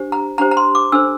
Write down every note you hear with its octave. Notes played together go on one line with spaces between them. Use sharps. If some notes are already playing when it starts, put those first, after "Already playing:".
Already playing: D4 G4 C5
A#5
D4 G4 C5 A#5
A#5
C6
D6
D4 A4 C5 E6